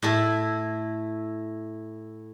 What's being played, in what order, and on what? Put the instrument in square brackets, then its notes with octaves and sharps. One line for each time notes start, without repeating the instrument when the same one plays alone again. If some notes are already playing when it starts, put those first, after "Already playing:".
[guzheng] A2 E4 A4